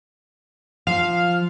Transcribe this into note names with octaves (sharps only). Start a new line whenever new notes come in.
F3 F5